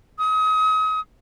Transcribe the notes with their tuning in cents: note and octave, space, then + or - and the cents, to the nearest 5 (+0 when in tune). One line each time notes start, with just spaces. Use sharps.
D#6 +35